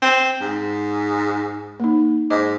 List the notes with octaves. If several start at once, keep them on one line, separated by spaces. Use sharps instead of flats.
C4
G#2
A#3 D#4
G#2 C5 D#5 D6